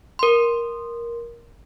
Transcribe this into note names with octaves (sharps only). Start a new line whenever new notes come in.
A#4 C6